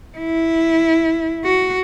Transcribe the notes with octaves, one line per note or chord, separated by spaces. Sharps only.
E4
F#4